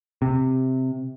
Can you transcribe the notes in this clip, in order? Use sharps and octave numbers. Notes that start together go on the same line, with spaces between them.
C3